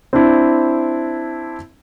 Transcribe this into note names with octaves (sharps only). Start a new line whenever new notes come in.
C4 D4 E4